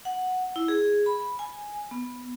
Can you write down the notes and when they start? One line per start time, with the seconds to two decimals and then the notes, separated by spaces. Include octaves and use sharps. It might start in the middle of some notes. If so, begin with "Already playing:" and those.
0.05 F#5
0.56 E4
0.68 G#4
1.06 B5
1.39 G#5
1.91 B3